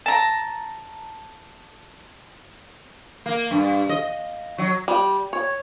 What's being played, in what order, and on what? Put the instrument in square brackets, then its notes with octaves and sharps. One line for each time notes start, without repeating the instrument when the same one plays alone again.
[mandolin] A5 A#5
[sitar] A#3
G2
D#5
F#3
[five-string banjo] G3
C#5